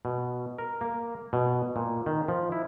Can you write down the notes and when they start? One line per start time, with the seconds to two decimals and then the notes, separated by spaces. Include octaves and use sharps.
0.05 B2
0.58 A#4
0.81 A#3
1.33 B2
1.76 A#2
2.06 D#3
2.28 F3
2.52 E4